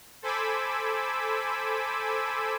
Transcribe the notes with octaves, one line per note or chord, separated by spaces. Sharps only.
A4 C5 G#5 B5 D6 E6